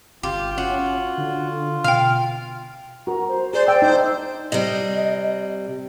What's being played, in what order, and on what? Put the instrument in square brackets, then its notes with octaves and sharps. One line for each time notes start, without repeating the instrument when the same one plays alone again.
[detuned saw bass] G1 [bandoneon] F4 [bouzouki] G4
[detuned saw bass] C#4 [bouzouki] F#4
[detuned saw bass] D3
[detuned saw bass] B2 [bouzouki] F5 [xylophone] G5 F6
[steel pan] F#4 A#4 [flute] A#5
[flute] C5
[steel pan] G#4 [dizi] C5 [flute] D5
[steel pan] G5 [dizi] E6
[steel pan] D#4 D5 [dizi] C5
[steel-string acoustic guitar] C3 G3 [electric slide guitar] D#5